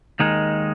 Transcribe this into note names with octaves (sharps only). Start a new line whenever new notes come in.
D#2 D#3 G#3 D#4